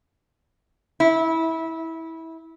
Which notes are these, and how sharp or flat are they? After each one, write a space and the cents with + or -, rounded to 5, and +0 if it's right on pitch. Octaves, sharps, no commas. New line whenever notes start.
E4 -20